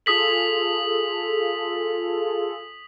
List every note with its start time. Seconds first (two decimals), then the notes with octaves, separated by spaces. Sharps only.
0.06 F4 G#4 A4 D#6 B6 F#7